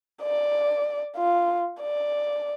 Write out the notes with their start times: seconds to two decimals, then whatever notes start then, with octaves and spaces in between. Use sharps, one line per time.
0.22 D5
1.17 F4
1.81 D5